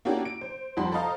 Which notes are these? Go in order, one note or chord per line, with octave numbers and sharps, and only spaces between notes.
A#3 C#4 D4 E4 F#4 G4
D7
C5
F2 F3 G3 F#5 B5 C6
A4 C5 D#5 F5 A#5